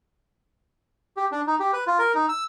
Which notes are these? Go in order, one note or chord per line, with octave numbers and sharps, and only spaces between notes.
G4
D4
D#4
G4
B4
F4
A#4
D#4
E6